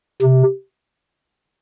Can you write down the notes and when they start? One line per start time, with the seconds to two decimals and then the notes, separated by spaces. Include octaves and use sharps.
0.22 C3